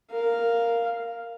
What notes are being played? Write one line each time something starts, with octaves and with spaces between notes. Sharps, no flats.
A#4 F5